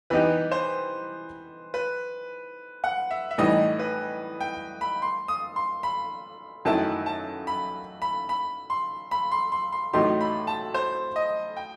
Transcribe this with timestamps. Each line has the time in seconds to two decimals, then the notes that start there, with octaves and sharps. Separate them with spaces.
0.10 E3 B3 D#4 G4 B4
0.51 C5
1.74 B4
2.84 F#5
3.11 E5
3.31 E5
3.38 A2 E3 G3 D#4 D#5
3.79 B4
4.41 G5
4.81 B5
5.02 C6
5.28 D#6
5.56 C6
5.83 B5
6.65 F#2 D#3 A3 E4 A5
7.06 A5
7.47 B5
8.02 B5
8.29 B5
8.70 C6
9.11 B5
9.32 C6
9.52 C6
9.72 C6
9.93 A2 F#3 A3 D#4 G4 C6
10.21 B5
10.47 A5
10.74 C5
11.16 D#5
11.57 G5